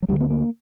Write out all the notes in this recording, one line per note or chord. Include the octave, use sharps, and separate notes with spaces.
F#3
D2 D3 G3
B3
A#3